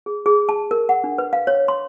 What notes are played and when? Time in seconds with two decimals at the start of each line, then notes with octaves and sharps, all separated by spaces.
0.06 G#4
0.26 G#4
0.49 A5
0.71 A#4
0.89 F#5
1.04 D4
1.18 B4
1.33 F5
1.47 C#5
1.68 C6